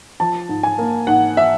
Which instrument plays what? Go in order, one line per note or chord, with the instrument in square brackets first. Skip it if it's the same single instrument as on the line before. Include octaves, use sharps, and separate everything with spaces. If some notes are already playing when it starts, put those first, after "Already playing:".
[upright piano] F3 A5
G#2
G#5
A#3
G#2 F#5
E5